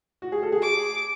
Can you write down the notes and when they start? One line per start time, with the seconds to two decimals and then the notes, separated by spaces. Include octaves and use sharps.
0.22 F#4
0.32 G#4
0.43 A4
0.52 G#4
0.62 D6